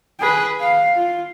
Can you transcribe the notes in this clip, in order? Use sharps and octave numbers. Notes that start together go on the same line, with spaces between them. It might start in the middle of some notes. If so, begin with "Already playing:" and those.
G#4 B4
F5
F4